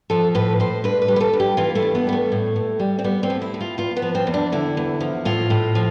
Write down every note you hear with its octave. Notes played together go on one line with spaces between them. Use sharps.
F3 A4
A2 B4
A2 C5
G2 B4
B4
G3
B4
A4
G2
G4
E3 F4
A3
G2
B3
G3 B3
A3
A2
A2
G3
C4
G3 B3
C4
A2
E4
A2
F4
E2 F4
B3
F3
C4
E2
D4
D3 E4
E2
F3
A2 F4
A2
F3